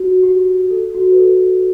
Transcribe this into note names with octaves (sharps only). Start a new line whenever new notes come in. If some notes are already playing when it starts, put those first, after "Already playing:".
Already playing: F#4
G4
A4
F#4
B4
A4